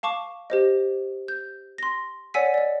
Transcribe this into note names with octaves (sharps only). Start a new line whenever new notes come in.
F5 A5 C#6 D6
G4 C5 D#5
G6
C6 A#6
C#5 D5 F#5 G#5 E6 B6
D5 D#5